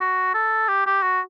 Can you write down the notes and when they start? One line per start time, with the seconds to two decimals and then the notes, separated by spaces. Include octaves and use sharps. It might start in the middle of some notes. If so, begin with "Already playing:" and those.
0.01 F#4
0.34 A4
0.68 G4
0.86 G4
1.02 F#4